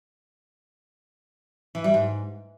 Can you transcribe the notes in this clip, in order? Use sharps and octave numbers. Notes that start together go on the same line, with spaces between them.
E3
G3
G#2